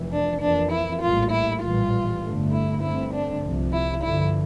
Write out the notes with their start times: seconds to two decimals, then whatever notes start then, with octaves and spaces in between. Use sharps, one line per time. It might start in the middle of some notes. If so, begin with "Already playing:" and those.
Already playing: F1 F2 E3
0.12 D4
0.41 F2 E3 A#3 D4
0.71 E4
1.02 A#1 A2 G3 A#3 F4
1.31 E4
1.62 A#1 A2 E3 G3 F4
2.22 G1 G2 D3 A3
2.52 E4
2.82 G1 G2 D3 A3 C4 E4
3.13 D4
3.43 C2 C3 F3
3.73 E4
4.03 G2 D3 F3 E4